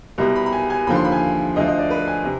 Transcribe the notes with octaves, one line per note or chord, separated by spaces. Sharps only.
C2 B2 G3
B5
B5
G#5
G#5
D#2 D3 F3 B5
C6
B5
G#5
D2 D3 F3 D#5
D#5
D5
B4
G#5
C3